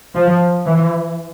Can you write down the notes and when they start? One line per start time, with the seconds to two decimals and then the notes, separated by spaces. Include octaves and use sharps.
0.14 F3
0.66 E3